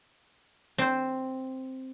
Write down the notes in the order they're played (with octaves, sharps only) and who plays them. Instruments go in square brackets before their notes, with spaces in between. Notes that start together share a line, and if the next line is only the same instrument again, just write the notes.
[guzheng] C4 C5